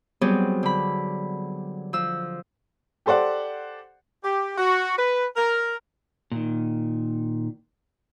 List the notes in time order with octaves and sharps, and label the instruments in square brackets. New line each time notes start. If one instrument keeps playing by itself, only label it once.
[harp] F#3 G3 B3 C4 G#4
D3 B5
F3 E6
[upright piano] G4 A4 C5 D5 F#5
[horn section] G4
F#4
B4
A#4
[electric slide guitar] A#2 D#3